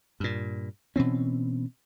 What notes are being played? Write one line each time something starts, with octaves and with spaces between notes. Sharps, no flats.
G2 A#2
B2 E3 C4 C#4